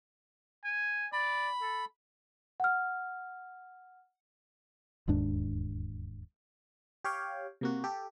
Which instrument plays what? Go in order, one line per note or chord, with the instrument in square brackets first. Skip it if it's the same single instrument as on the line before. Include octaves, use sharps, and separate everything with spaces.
[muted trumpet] G#5
[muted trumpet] D5 [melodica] B5
[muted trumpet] A4
[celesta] F#5 F6
[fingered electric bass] E1 D#2 G#2 D4
[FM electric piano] G4 C#5 F5 G5
C3 A#3 F#4
G4 A4